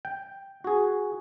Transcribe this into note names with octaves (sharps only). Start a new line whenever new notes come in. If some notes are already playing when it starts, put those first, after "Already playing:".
G5
F#4 G#4